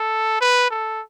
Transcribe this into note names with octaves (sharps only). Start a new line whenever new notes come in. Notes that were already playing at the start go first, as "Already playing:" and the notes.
Already playing: A4
B4
A4